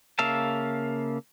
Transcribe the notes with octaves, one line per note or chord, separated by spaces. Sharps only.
C#3 A#3 E5 F5 A5